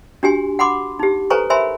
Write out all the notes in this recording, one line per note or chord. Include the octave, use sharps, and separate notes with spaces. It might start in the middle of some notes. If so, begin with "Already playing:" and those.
D4 F#4 G4 G#5 C6
F#5 B5 C6 D6
D#4 G4
A4 B4 C5 G#5 A#5 C#6
A#4 C5 E5 G#5 B5 C6